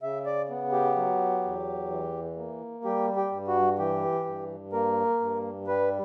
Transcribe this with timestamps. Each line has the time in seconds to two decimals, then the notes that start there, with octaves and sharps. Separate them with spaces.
0.02 C#3 E5
0.26 D5
0.50 B3
0.72 G4
0.96 F#3
1.43 E2
1.90 E3
2.37 A#3
2.85 G3 G4
3.16 G4
3.32 G2
3.48 F#4
3.79 E3 G4
4.26 G2
4.72 A#3 A#4
5.21 G2
5.67 G3 B4